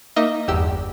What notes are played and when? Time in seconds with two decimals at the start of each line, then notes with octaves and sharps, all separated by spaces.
0.16 A#3 D#4 D#5 E5
0.48 G1 E2 G4 E6